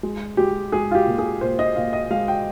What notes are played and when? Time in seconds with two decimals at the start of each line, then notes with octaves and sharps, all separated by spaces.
0.03 G#3
0.37 G#3 G4
0.72 G#3 G#4
0.91 F4
0.95 G4
1.07 A#2
1.18 G#4
1.41 A#2 C5
1.59 D#5
1.76 A#2 F5
1.93 D#5
2.11 G#3 F5
2.28 G5